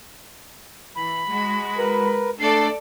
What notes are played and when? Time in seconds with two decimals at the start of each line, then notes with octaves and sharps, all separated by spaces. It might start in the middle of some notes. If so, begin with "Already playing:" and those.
0.95 E3 B5
1.27 G#3 F#4
1.78 A#4 B4
2.40 A3 D4 A4 D5 C7